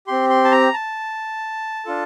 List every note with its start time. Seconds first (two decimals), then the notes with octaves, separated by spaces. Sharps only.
0.07 C4 G4 C6
0.30 C6
0.45 A5
0.52 A#5
0.74 A5
1.85 D4 F4 A4